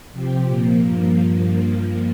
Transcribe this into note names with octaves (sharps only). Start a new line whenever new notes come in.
C3 F3 C4 G4
A#2 F3 A#3
G2 F3 A#3